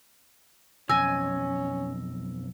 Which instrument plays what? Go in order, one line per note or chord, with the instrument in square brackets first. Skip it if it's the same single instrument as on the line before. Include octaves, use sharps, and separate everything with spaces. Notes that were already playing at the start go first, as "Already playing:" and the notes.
[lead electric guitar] B1 F2 [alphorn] C#4 [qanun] G#5 [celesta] E6 A#6